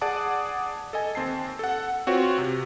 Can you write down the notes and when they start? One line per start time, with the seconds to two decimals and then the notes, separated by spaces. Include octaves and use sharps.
0.01 G#4 D5 F#5 A5 D6 D#6
0.93 A4 D#5 G#5
1.15 D#2 C4 A5 C7
1.59 A4 F#5
2.07 C4 F4 F#4 B4 C#5
2.38 C3